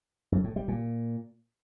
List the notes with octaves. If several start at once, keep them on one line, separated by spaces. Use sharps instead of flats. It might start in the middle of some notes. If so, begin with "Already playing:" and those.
F#2
A2
G3
A#2